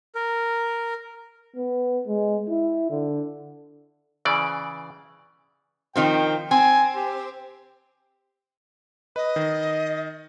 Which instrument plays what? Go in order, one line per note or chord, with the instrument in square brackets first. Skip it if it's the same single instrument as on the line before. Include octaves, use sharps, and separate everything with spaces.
[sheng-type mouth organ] A#4
[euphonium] B3
G#3
E4
D3
[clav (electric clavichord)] C#3 E3 D5
[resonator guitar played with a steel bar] D#3 F3 C4 [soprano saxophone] G5
[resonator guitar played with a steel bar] C4 [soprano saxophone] G#5
[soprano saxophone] G4
[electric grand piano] B4 [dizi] D#5
[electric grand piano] D#3